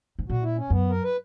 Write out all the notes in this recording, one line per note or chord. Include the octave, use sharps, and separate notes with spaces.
G#2
A#2 F#4
E4
C#4
F#2 B3
A#4
B4